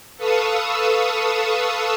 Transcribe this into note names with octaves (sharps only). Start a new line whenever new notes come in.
A4 B4 F5 C#6 D#6 E6